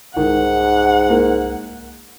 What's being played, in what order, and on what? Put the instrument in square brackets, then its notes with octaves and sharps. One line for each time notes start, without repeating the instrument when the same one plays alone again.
[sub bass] C2 [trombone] G#2 [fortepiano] D#3 [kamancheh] F#5
[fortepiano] A#3